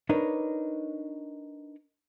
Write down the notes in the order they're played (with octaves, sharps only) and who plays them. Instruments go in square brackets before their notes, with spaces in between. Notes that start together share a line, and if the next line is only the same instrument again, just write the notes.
[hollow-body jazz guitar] D4 D#4 A#4 B4 C#5